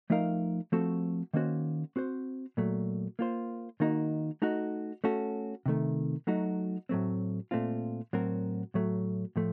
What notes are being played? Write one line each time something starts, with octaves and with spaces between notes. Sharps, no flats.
F3 A3 D#4 A#4 F5
F3 A3 C4 F#4 A4
D#3 A#3 C#4 F#4 C5
C4 F#4 C5
A#2 F#3 A3
A#3 F4 C5
D#3 A#3 D#4 F#4
A3 D#4 F#4
A3 C#4 F#4 A4
C3 D#3 A3
F#3 A3 D#4 F#4
A2 F#3 A3 C4
A#2 A3 C4 F4
A2 F#3 C4 F#4 A#4
A2 F#3 A3
A2 F3 A3